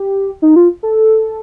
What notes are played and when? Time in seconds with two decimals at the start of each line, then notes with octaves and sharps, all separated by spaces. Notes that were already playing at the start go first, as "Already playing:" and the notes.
Already playing: G4
0.42 D#4
0.56 F4
0.83 A4